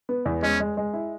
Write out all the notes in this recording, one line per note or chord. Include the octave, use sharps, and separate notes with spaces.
B3
E2
G#3 C#4
G#3
G#3
E4